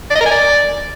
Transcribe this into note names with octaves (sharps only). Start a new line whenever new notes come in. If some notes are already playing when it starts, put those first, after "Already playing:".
D5
D#5
A#4
G#5
D5